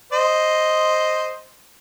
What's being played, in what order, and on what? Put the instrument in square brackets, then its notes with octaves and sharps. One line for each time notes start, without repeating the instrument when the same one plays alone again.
[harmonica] C5 D#5